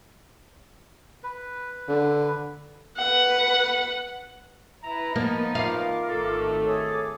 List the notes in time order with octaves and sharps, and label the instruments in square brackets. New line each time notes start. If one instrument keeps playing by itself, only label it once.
[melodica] B4
[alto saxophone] D3
[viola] B4 F#5
[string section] E4 B4 [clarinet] A#5
[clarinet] F3 [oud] A#3 [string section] B3 D#4
[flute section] F4 A#4 D6 [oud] F5
[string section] G#1 D#3 A3 [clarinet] A4
[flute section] G#4 C#5 D6